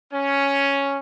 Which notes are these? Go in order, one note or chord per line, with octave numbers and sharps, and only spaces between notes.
C#4